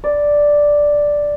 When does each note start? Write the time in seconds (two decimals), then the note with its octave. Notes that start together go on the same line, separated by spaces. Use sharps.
0.04 D5